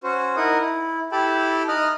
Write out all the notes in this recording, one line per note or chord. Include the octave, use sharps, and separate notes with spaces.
C#4 F#4 C5
D#4 E4 A#4 F#5 D#6
E4
E4 G4 A4 G5 A5 B5
D#4 D#5 D#6 F6 F#6